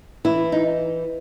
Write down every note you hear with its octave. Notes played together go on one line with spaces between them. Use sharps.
E3 E4
D#4